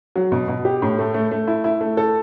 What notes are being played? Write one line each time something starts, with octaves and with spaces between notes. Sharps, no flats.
F#3
B2
B2
G4
A2
A3
A3
A3
E4
E4
A3
A4